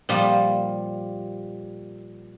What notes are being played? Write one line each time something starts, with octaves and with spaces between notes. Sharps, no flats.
A#2 F3 G3 A#3